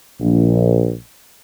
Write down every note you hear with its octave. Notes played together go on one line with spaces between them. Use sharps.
A#1